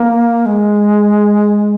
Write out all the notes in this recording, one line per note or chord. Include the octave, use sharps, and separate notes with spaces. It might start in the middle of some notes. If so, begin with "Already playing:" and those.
Already playing: A#3
G#3